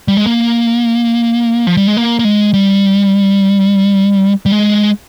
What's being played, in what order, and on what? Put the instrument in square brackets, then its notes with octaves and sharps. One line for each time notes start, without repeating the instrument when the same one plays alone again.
[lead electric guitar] G3
G#3
A#3
F3
G3
G#3
A#3
A#3
G#3
G3
G3
G#3